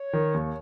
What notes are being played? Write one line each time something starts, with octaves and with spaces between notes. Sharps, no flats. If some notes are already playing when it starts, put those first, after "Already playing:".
Already playing: C#5
D#3
D#2